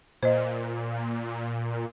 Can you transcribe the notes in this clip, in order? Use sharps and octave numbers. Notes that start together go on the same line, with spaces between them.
A#2 C5 D#5